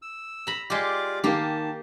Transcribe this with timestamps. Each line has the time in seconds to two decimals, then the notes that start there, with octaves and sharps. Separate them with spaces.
0.02 E6
0.47 A#5 B5
0.70 G#3 F4 G4 D5 D6
1.24 D#3 A#3 G4 F5 A5